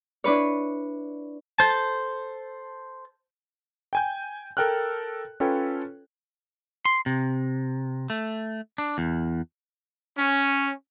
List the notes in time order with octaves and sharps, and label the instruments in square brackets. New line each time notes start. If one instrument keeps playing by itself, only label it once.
[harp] D4 E4 B4 C#5
[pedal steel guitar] A4 C5 A5
[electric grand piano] G5 G#5 G6
A4 A#4 G5 F6 F#6
C#4 F4 A4 B4 C#5 G5
[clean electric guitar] C6
C3
A3
D4
E2
[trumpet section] C#4